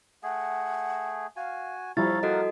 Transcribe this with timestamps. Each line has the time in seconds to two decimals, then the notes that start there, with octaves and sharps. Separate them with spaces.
0.23 A3 G#4 F#5
1.36 F#4 F5 G#5
1.97 F3 G3 E4 A4 C#5 F5 A#5 A6
2.23 A#3 F#4 A4 A#4 D#5 F#5